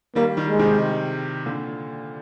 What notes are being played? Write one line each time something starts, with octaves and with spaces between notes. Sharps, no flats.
D#3 G3 A#3
D#3 G3
G#3
C3 D#3
A#2 D3